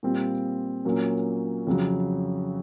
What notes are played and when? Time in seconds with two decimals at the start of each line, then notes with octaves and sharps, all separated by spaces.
0.03 A#2 G3 C4 F4
0.85 A#2 F#3 A#3 C#4
1.67 F2 C#3 F#3